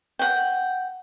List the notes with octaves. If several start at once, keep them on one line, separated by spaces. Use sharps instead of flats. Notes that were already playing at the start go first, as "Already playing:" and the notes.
F#5 G5